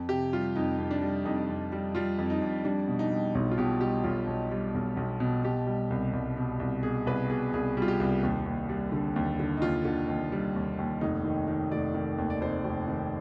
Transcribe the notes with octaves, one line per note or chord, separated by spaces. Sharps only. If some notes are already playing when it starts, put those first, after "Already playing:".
Already playing: F2
C3 G4
G3 F4
F2 D#4
F2
D4
G3
F2 D#4
F2
G3
G3 F4
F2
D#4
F2
G3 D4
B2
D#4
G3
B1 D#4
F4
B2 G4
G3 G4
B1 F4
B1
G3
B1
B1
B2
B2 G4
G3
C2
C2
B2
C2
B2 G#4
C2 B4
B2 G#4
C2 G#4
G3 F4
G4
C2
D#2
D#2
G3
D3
D#2
D3
D#4
D#2 F4
D3
D#2
G3
D#2
D#2
F1 D#4
D#3
D#3
F1 D5
D#3
D#2
D5
F1 C5
F1
D#3